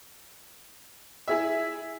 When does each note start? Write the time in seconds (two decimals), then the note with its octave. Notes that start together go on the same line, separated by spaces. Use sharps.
1.28 E4 G#4 E5